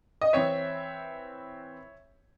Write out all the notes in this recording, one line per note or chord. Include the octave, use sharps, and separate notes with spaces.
D#5
E3 C4 C#5 E5